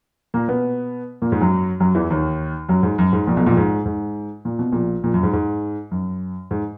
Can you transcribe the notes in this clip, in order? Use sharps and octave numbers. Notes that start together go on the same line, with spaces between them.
A#2 A#3
B2 B3
A#2 A#3
G#2 G#3
F#2 F#3
F#2 F#3
E2 E3
D#2 D#3
F#2 F#3
G#2
F#2
G#2
A#1 A#2
B1 B2
A#1 A#2
G#2
G#2
A#2
B2
A#1 A#2
A#1 A#2
F#2
G#2
G#2
F#2
G#2